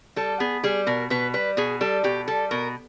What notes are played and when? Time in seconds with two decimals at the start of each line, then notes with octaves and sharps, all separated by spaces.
0.16 G3 A4
0.40 B3 G#4
0.63 G3 G#4
0.87 B2 A#4
1.10 B2 B4
1.34 G3 B4
1.57 B2 G#4
1.81 G3 A4
2.04 B2 G4
2.28 G3 A4
2.51 B2 A#4